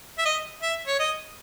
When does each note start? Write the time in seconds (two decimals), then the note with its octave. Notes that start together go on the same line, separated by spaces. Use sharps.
0.19 E5
0.25 D#5
0.62 E5
0.87 C#5
0.99 D#5